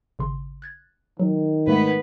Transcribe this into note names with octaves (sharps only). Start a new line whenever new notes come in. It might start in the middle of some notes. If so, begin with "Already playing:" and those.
G#1 C#3 C6
F#6 G#6 A6
D#3 F#3
G#2 G#3 A3 B3 B4